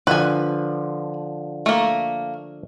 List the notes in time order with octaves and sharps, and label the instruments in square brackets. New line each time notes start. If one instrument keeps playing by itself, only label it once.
[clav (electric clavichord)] D3 F3 [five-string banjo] B4 G#5
[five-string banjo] A3 A#3